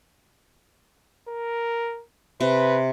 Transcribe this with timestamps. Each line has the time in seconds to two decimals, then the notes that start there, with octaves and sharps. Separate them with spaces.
1.28 A#4
2.41 C3 B4